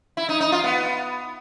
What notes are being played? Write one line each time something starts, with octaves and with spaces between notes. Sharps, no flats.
E4
D#4
D#4
F4
B3